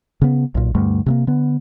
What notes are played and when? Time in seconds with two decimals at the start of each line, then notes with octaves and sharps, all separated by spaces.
0.21 C#3 B3
0.55 B1 A#2
0.75 D2 G2 G3 A3
1.06 C3 A3 A#3
1.27 D3 B3